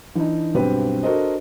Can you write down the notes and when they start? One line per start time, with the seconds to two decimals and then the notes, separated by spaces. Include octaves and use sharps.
0.15 E3 D4 D#4
0.54 B1 G2 C4 G4 B4
1.03 D4 F#4 A4 A#4 C5 D#5